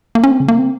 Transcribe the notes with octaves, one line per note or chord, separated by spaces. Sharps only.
A#3
C#4
C4
C#3
A#3
C4